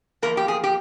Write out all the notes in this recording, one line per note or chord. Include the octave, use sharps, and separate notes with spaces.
E2 C3 F3 A#3 A#4
G4
G#4
G4